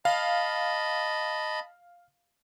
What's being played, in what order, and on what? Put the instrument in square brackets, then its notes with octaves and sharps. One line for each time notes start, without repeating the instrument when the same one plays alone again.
[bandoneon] D#5 A5 B5 [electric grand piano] F5